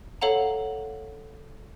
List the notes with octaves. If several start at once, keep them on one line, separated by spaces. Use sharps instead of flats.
A4 C#5 F5 F#5 A#5